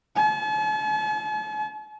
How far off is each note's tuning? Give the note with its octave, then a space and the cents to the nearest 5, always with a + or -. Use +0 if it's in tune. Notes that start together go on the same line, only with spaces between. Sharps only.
A5 -45